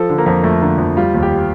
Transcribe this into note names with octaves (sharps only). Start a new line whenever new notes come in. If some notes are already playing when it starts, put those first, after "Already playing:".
Already playing: F3 A4
D3
A#3
F2
F2 A3
D3 A#3
F2
G3 F4
D#2
G4